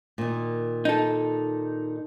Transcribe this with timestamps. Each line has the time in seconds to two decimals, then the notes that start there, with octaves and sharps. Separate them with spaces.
0.18 A#2 D#3
0.85 D#4 A4